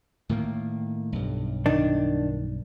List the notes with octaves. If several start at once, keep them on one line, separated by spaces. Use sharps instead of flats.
A2 D#3 A#3
B1 G2
D#3 D4